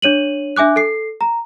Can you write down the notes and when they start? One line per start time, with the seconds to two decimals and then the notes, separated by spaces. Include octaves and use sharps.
0.02 D4 C#5 D#7 F#7
0.56 D4 E5 G#5 D6 F#6
0.76 A4 C7
1.21 A#5